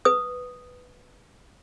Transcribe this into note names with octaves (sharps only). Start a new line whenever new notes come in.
B4 D#6